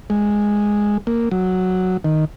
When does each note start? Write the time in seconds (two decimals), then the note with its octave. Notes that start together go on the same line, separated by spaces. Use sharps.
0.10 G#3
1.07 A#3
1.31 F#3
2.04 D#3